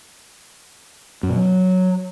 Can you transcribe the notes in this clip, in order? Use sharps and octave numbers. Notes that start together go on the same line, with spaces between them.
F#2
B2
F#3